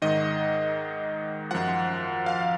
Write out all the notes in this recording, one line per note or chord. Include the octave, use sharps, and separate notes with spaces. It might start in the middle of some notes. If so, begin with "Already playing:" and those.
G#2 D#3 D#5
F#2 F3 F#5
F5